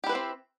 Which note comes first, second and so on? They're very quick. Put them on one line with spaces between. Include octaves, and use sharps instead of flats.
G4 E4 B4 C5 C4